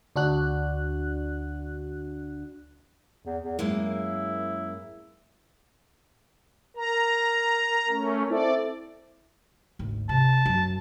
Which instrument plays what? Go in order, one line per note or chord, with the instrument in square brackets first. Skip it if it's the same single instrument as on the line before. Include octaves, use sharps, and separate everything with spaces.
[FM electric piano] D2 D4 F#4 F#6
[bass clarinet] E2
E2
[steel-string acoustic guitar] F#2 G#3 A#3 [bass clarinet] E4
[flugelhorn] A#4 [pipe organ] A#5
[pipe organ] A3 C#4
[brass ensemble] C4 E4 A4 [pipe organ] D5
[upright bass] G#1 D2
[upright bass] C3 [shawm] A5
[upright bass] F#2 F#3